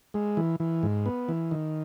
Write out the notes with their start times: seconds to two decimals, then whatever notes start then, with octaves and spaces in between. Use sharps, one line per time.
0.14 G#3
0.37 E3
0.60 E3
0.83 G#2
1.06 B3
1.29 E3
1.51 D#3